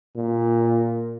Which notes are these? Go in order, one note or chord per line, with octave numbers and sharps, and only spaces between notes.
A#2